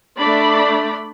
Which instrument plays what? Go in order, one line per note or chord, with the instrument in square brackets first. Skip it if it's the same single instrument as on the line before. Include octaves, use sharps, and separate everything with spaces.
[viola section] A3 D4 D5 B5